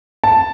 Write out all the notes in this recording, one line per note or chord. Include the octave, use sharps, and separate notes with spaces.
A5